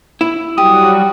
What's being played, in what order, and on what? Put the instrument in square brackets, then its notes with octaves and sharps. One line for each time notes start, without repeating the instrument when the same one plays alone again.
[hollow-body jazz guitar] E4
[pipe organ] F#3 G3 F#4 [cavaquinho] G4 [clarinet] D#6